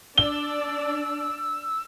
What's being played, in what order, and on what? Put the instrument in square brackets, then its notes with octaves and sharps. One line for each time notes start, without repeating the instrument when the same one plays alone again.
[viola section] D4 D5 [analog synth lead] E6 [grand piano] G7